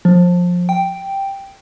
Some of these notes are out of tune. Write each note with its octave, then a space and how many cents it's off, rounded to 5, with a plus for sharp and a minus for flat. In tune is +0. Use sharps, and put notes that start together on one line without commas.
F3 +20
G5 +0